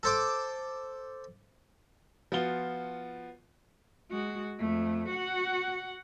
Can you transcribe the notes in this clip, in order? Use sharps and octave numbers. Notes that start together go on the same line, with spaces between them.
A4 C5 D6
F3 B3 F4 F#4 G7
G#3 F#4
F2 A3
F#4 F#5